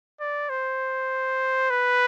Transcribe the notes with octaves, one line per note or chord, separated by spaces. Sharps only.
D5
C5
B4